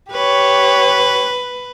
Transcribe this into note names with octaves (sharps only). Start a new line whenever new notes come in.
G4 B4 C#5